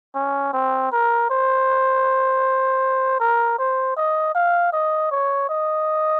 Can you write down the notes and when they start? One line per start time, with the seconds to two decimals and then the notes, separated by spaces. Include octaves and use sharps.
0.15 C#4
0.53 C4
0.91 A#4
1.30 C5
3.20 A#4
3.58 C5
3.96 D#5
4.35 F5
4.73 D#5
5.11 C#5
5.49 D#5